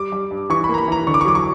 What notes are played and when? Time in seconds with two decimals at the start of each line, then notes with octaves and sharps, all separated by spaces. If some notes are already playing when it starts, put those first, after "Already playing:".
Already playing: G3 D6
0.12 G3
0.31 G2
0.50 E3 C#6
0.64 B5
0.69 A#3 A#5
0.78 B5
0.88 E3 A#5
1.07 D3 C#6
1.14 D6
1.21 C#6
1.25 F#3 D6
1.35 C#6